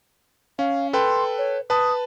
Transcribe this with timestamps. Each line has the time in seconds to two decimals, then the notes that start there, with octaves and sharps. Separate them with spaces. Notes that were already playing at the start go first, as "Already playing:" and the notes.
0.59 C#4 F5
0.93 A4 B4 G5 C6
1.38 C#5
1.70 B4 A5 D#6